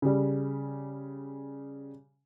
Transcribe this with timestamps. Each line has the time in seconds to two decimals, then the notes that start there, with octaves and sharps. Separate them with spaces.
0.02 C#3 G3